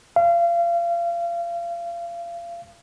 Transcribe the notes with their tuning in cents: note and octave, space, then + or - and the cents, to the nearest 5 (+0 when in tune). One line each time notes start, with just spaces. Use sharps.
F5 -30